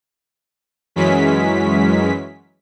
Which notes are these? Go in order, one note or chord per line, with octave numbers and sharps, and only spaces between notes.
F#2 E3 F#3 G#3 C#4 B6